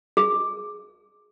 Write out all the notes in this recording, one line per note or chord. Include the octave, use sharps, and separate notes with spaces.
G#4